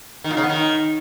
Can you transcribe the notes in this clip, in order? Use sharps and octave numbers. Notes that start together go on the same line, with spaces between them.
D#3
A#2
C#3
B3
D#3